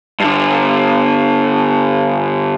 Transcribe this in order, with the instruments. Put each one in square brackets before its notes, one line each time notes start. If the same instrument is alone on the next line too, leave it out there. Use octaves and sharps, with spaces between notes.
[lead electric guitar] G2 D3